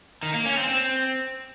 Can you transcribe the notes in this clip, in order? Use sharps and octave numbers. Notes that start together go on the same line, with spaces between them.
D#3
A#3
C#4
C4
C4